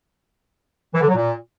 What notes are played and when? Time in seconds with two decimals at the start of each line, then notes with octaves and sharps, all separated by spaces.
0.94 E3
1.01 D3
1.08 F#3
1.15 A#2